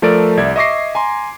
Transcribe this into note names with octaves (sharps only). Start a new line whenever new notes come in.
F3 A3 A4 A#4 D5 D7
C2 D5 E5 G#6
D#5 E5 C#6 D6 A#6 C7
G#5 A#5 C6